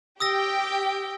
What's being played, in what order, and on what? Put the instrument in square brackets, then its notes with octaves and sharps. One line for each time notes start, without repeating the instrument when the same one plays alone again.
[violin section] G4 G5 [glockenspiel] D#6 E6 A#6